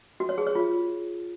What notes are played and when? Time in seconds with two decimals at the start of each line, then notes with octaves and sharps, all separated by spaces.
0.20 F#4
0.29 C#5
0.38 G#4
0.47 C#5
0.55 F4